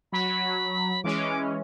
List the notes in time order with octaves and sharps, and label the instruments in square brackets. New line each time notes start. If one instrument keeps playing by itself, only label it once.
[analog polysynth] F#3 [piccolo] B5
[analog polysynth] E3 G#3 C#4 [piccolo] D6